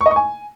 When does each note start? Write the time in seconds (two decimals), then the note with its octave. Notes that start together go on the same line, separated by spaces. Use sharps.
0.01 C#6
0.06 D#5
0.11 C#6
0.16 G#5